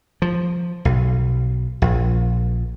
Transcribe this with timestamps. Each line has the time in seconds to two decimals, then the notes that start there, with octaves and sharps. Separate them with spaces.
0.22 F3
0.85 B1
1.82 A#1